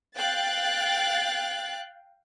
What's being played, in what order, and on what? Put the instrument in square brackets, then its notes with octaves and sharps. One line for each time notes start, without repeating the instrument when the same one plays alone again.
[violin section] F5 G5 F#6 A6